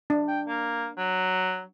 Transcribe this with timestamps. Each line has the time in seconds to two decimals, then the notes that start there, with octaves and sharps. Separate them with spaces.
0.10 D4
0.28 G5
0.48 A#3
0.97 F#3